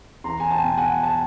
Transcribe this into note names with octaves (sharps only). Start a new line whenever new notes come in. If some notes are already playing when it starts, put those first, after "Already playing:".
E2 A#5 C6
G#5
G5 A5
B2
F#5 G#5
G5 A5